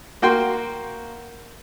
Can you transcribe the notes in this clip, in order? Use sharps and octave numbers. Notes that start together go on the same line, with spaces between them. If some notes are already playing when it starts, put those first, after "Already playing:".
A#3 F#4 G5 C6